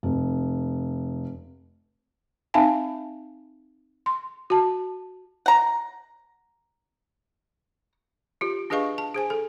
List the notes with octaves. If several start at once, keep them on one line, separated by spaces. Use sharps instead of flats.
F1
C4 D#4 E5 F5 G#5 A5
C6
F#4 A5
F#5 A#5
F4 G4
D4 G#4 B4 D#5 F5 C#6
A5
G#4 C5 G#5
A4